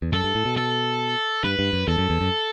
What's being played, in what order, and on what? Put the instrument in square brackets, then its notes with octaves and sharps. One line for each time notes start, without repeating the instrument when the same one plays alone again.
[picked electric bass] E2
[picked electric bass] F#2 [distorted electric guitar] A4
[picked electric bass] G2
A2
B2
[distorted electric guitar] A4
[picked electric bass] G2 [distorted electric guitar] B4
[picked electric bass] G2
F#2
[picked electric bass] E2 [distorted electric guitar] A4
[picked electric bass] F#2
E2
F#2